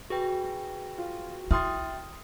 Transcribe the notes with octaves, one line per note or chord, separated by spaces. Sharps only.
F#4 G#4 B4 G5
F4
E4 E5 G5 C6 D#6 F6 A6